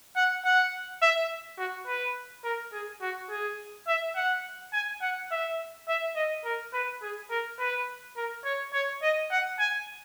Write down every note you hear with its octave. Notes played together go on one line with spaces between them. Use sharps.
F#5
F#5
E5
F#4
B4
A#4
G#4
F#4
G#4
E5
F#5
G#5
F#5
E5
E5
D#5
A#4
B4
G#4
A#4
B4
A#4
C#5
C#5
D#5
F#5
G#5